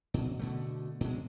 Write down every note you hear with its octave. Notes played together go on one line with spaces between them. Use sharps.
B2
B2 D3 A3
B2 G#3